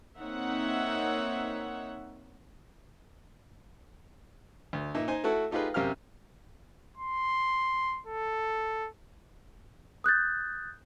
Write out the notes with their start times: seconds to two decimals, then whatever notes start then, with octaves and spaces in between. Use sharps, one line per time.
0.20 A#3 C4 D#4 C#5 E5 F#5
4.73 D2
4.95 A#2 D#4 E5
5.08 D#4 C5 G#5
5.24 A3 E4 F#4 A4
5.51 A3 D#4 F4 G4 G#4 B4
5.74 F#2 C3 G4 A#4 F5 F6
6.97 C6
8.06 A4
10.04 D#6 F#6 G6 A6